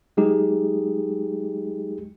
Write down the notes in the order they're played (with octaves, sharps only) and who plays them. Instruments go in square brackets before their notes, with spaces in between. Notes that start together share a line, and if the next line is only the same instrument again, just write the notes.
[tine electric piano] F#3 G#3 D#4 G4 G#4